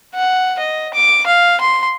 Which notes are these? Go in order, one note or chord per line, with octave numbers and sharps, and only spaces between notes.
F#5
D#5
D6
F5
C6